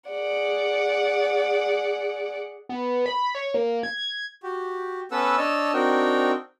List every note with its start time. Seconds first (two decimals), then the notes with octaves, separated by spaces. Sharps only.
0.10 G#4 D5 F#5
2.69 B3
3.06 B5
3.35 C#5
3.54 A#3
3.83 G#6
4.43 F#4 G4
5.12 B3 C#4 A4 B4 F#5 E6
5.38 D4 C#5 D#5 A5 E6
5.74 C4 D4 D#4 F#4 A#4 G5